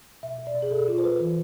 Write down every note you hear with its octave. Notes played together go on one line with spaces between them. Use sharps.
B2 E5
B2
D5
B2
G#4
B2 A4
B2 F4
C5
B2 B4
E3